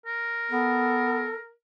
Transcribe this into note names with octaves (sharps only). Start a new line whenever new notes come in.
A#4
B3 A4